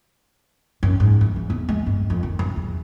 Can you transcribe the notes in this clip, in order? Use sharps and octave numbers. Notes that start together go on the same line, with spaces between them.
F#2
G#2
E3
F#3
E2
G#3
G2
F2
D#3
F#2
E2